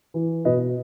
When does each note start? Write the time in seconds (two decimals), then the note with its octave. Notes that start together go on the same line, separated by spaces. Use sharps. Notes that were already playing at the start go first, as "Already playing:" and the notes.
0.14 E3
0.45 B2 B4 D#5